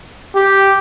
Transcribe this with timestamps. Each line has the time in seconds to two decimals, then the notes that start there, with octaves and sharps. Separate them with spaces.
0.36 G4